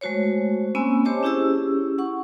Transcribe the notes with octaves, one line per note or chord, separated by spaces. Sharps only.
G#3 A3 F#4 C5 C#5
A#3 C4 C#4 G#5 B5 E6
G4 C5 C#5 D#5 A5 D6
C#4 E4 G4 G#4 E6
F#5 C#6